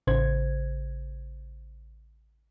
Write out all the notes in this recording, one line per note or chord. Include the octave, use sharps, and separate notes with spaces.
A1 C#3 C5 G#6